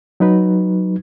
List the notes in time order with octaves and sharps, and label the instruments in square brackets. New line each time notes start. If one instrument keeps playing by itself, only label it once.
[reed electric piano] F#3 D#4 B4